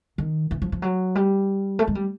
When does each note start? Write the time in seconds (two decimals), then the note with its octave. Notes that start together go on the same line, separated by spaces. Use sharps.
0.18 D#3
0.51 E3
0.62 F3
0.72 F3
0.82 F#3
1.15 G3
1.79 A3
1.87 G#3
1.95 G3